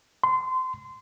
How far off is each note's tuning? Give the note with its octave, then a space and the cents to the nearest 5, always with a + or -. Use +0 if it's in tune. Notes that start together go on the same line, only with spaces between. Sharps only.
C6 -25